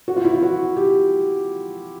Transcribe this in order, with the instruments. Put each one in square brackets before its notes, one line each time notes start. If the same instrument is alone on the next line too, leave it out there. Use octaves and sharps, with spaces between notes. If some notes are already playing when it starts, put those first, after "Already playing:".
[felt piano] F#4
F4
E4
F4
F#4
G4